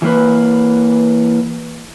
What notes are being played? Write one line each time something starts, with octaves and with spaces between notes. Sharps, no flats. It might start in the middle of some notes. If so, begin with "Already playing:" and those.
E3 A#3 B4